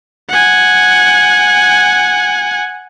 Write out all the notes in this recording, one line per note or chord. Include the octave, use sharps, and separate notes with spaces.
F#5 G#5